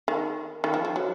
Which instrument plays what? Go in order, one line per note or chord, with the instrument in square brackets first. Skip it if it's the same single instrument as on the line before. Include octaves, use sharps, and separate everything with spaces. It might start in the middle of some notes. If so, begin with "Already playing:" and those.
[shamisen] D#3
D#3
F3
F3
F#3